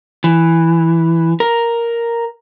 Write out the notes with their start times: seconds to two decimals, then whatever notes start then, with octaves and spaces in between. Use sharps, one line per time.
0.24 E3
1.40 A#4